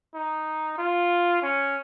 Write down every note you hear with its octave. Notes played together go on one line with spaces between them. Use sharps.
D#4
F4
C#4